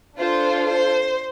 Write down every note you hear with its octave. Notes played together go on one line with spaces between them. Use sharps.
D4 F4 A4 C5
C5